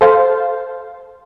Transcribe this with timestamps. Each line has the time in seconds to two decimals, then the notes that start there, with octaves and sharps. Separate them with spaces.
0.01 A4 C5 F5